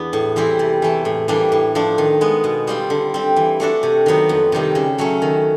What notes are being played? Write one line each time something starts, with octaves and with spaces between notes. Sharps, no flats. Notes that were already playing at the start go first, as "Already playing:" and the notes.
Already playing: E2 B3 D4
A2
E3 G3 C4 E4
C3
E3 A3
A2
E3 G3 A#3 D4
A2
F3 A3 D4
D#3
G#3 B3
B2
G3 C4 F4
D3
G3 C4
E3
A3 D4 F#4 A4
C3
D#3 F#3 B3
F2
C3 D#3 G3
C#3
F#3 A3 C#4
D#3